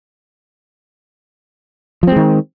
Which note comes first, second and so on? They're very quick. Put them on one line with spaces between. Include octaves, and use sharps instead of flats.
F3 C4 G#3 D#3